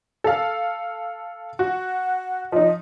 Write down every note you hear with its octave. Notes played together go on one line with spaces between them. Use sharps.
A4 F5
F#4 F#5
F3 D#4 D#5